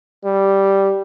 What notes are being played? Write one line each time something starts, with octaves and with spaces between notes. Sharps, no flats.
G3